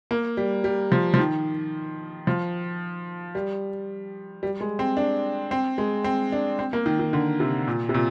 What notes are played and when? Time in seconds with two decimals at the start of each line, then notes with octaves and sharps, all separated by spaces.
0.11 A#3
0.37 G3
0.64 G3
0.92 F3
1.14 F3
1.19 D#3
2.27 F3
3.35 G3
4.43 G3
4.61 G#3
4.79 C4
4.97 D4
5.51 C4
5.78 G#3
6.04 C4
6.32 D4
6.59 C4
6.73 A#3
6.86 D#3
6.99 D#3
7.13 D3
7.40 C3
7.67 A#2
7.89 C3
7.94 A#2